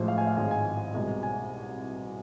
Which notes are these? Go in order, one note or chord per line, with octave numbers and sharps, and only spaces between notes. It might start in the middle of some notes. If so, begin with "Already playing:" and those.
Already playing: A1 A2 F3 G#3 C5
F5
G#5
F5
G#1 G#2 G#3 G#5
G#5
C2 B2 G#3
G#5